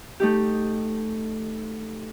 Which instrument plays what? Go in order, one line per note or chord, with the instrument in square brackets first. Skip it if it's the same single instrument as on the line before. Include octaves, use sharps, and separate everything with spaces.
[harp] A3 D#4 G4